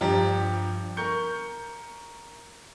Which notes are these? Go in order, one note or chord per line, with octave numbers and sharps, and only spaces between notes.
G2 F3 G4 A#5
A#4 C#6 G6 C#7